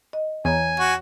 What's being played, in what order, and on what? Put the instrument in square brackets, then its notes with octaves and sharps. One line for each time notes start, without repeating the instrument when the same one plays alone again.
[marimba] D#5
[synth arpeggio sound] E2 [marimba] C#5 A#5 [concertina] G#5
[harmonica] F#4